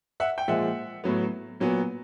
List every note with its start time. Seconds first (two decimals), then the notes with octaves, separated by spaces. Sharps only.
0.20 E5 F#5
0.38 G5
0.48 A#2 F3 G#3 E5 F#5
1.04 A2 F#3 B3
1.60 A#2 F#3 B3